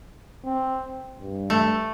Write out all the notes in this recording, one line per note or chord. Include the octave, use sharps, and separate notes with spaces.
C4
G2
A3